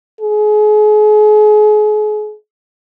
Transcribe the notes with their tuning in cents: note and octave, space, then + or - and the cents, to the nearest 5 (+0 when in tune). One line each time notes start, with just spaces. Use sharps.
G#4 +35